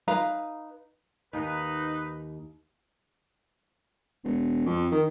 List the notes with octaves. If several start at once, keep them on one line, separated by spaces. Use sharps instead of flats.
D#4 B4 F5 A#5
D#2 D#4 B4
E1
F2
D#3